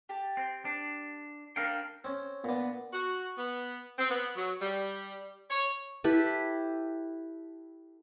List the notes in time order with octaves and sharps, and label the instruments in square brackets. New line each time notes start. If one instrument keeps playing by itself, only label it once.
[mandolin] G4 A5
[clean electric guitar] C4
D4
[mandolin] D4 F6 [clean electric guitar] A#4 F5 G5
[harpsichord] C4 C#4
[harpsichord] A#2 D4 [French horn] B3
[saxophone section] F#4
B3
C4
B3
F#3
G3
C#5
[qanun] E4 G4 A4 B4